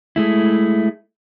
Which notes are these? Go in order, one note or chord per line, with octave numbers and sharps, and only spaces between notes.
G#3 A3 E4